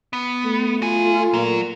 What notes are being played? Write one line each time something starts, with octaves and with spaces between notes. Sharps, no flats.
B3
A3
F4 F#4 G#5
A#2 F#3